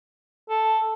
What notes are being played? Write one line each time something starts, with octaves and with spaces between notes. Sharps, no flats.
A4